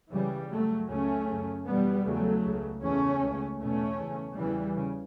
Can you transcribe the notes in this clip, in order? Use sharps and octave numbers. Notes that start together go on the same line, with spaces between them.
C#2 C#3 E3 G3
F#2 C#3 F#3 A3
C#2 C#3 A3 C#4
F#2 C#3
E2 B2 G3 B3
E2 C#3 F#3 A3
C#2 C#3
E2 C#3 A3 C#4
C#2 C#3
E2 B2 A3 C#4
E2 C#3
E2 C#3 E3 G3
C#3